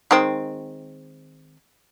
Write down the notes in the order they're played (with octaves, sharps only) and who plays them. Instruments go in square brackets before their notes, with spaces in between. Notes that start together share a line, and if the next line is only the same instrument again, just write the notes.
[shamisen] D#3 G#3 C4